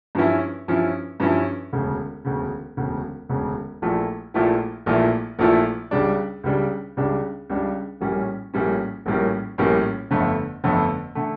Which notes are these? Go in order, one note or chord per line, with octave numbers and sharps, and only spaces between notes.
G2 F3 C#4 E4
G2 F3 C#4 E4
G2 F3 C#4 E4
E1 D2 C#3
E1 D2 C#3
E1 D2 C#3
E1 D2 C#3
A#1 A#2 F3 A3 E4
A#1 A#2 F3 A3 E4
A#1 A#2 F3 A3 E4
A#1 A#2 F3 A3 E4
C#2 C#3 G3 D4
C#2 C#3 G3 D4
C#2 C#3 G3 D4
C#2 C#3 G3 D4
A#1 A2 G3 A#3 C#4
A#1 A2 G3 A#3 C#4
A#1 A2 G3 A#3 C#4
A#1 A2 G3 A#3 C#4
G1 F2 D3 A3
G1 F2 D3 A3
D3 A3